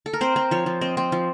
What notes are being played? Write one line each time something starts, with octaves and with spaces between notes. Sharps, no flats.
A4
A#4
C4 C5
C4
F3 C#5
F3
C4 D#5
C4
F3